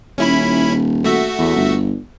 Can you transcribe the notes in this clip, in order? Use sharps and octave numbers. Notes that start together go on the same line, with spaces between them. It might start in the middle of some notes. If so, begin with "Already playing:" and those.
D#1 C#4 E4 B5
A3 F#4 E5
E2
G1